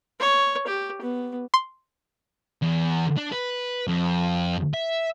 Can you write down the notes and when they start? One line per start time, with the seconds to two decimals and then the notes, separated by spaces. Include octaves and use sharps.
0.20 C#5
0.67 G4
1.01 B3
1.54 C6
2.62 E2
3.17 D4
3.32 B4
3.88 F2
4.73 E5